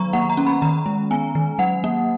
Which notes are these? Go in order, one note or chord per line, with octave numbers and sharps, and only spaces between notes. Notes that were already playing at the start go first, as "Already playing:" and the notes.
Already playing: D#3 F#3 B3 A#5 C#6
A#3 F#5
A#5
C#4
B5
D#3 A#5
G#3
B3 G#5
D#3
F#3 F#5
A#3